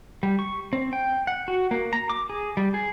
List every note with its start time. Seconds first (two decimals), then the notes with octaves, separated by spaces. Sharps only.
0.23 G3
0.39 C#6
0.73 C4
0.93 G5
1.27 F#5
1.48 F#4
1.71 A#3
1.93 A#5
2.10 D6
2.30 G#4
2.57 G3
2.74 G#4